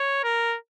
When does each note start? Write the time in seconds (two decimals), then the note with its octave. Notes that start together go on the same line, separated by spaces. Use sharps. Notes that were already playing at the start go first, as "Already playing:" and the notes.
Already playing: C#5
0.24 A#4